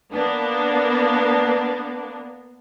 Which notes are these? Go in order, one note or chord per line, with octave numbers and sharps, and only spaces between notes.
A#3 B3 D4